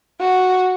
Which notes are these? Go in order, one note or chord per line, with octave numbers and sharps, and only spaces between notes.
F#4